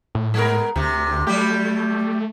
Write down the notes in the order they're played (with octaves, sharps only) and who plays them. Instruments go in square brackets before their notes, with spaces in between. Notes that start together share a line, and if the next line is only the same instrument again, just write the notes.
[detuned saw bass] A2
[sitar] G#3 B3 A#4
[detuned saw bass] D2 [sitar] C3
[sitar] F#3 G3 G4 [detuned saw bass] A3